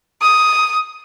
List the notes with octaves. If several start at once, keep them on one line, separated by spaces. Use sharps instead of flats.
D#6